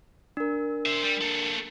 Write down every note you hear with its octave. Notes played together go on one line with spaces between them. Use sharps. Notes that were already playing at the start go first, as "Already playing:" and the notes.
D4 A#4
C5 E5
G3
A#3 A4